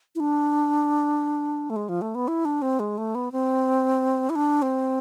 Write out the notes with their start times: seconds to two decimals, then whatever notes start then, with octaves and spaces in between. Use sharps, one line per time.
0.15 E4
0.20 D4
1.70 A3
1.76 G#3
1.89 F3
2.01 A3
2.15 B3
2.28 E4
2.45 D4
2.62 C4
2.80 G#3
2.98 A3
3.15 B3
3.32 C4
4.30 E4
4.35 D4
4.62 C4